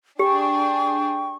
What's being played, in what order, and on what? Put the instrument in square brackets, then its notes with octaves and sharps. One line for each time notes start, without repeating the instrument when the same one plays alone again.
[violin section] D4 G#4 [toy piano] G4 [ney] G5 [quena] C#6